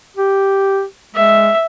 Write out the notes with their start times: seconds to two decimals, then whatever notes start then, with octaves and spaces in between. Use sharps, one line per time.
0.17 G4
1.15 G#3 E5